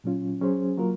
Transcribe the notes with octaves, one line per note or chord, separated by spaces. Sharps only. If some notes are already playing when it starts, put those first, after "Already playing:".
A#2 F#3 C#4 F4
F#3 C#4 G#4 C5
F#3 A#3 F4 A#4